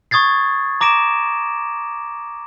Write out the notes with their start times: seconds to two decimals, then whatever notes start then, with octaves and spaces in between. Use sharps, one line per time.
0.11 C#6 D#6 G#6 A6 C7
0.81 A#5 D6 A#6 D7 E7